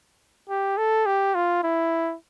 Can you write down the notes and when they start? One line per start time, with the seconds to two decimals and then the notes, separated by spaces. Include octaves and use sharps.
0.49 G4
0.78 A4
1.06 G4
1.35 F4
1.64 E4